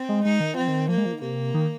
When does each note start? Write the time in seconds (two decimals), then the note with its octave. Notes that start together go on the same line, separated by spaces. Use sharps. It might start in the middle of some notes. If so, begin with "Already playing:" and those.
Already playing: C4
0.09 G#3
0.24 G#3 D#4
0.40 D#3
0.54 F3 C4
0.68 D#3
0.89 F3 A#3
0.98 G#3
1.06 F3
1.13 D#3
1.21 C3 A#3
1.54 D#3